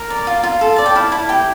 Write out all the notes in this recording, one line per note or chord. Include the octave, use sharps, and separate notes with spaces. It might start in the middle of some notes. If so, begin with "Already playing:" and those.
Already playing: A#4
D5
F4
F4
A4
D5 A5
G5
E4 F5
E4 A5
G4 G5